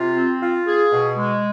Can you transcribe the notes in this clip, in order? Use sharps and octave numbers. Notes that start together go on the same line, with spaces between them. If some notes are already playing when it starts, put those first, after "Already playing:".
Already playing: C3 F4
C4
F4
G#4
B2
G#3